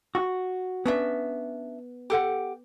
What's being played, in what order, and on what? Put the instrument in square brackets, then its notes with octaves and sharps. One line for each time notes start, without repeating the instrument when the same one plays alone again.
[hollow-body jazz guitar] F#4
[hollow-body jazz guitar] B3 [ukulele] C#4 D4 E5
[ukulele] G4 A4 F#5